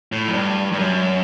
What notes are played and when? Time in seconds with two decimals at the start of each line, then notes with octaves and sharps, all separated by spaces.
0.12 A2
0.28 F#2
0.34 G2
0.72 G2
0.79 F#2